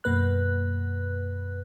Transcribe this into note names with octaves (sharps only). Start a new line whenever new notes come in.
F#2 B2 A#3 B4 F#6